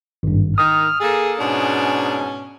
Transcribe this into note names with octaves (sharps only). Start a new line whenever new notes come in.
G#1 G2
D#3 D#6 F6
A#3 G#4 A4
G#2 B2 C#4 D4